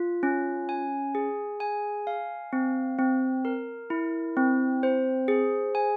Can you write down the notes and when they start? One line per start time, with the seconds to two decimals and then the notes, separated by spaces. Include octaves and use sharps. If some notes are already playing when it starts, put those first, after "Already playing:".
Already playing: F4
0.23 C#4
0.69 G#5
1.15 G#4
1.60 G#5
2.07 F5
2.53 C4
2.99 C4
3.45 A#4
3.90 E4
4.37 C4
4.83 C5
5.28 G#4
5.75 G#5